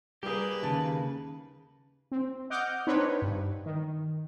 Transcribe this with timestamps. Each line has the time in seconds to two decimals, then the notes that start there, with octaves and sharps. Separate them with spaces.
0.23 G3 A#3 G4 G#4 B4
0.63 D#2 C#3 A5
2.12 C4
2.50 D#5 F#5 D6 F6 G6
2.87 C4 D4 D#4 B4 C#5
3.22 G2
3.66 D#3